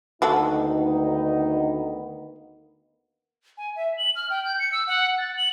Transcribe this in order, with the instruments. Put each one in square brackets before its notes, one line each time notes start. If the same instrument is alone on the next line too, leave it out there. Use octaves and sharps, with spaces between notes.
[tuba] D2 [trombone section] D#3 A#3 B3 [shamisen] F#3 F#4 A4 [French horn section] D#4
[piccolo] G#5
E5
F#7
F6
G5
G6
C#7
E6
F#5
A6
F#7